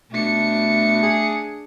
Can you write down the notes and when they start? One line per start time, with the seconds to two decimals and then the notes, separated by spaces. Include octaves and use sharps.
0.11 B2 A3 D4 C#7
1.03 G#4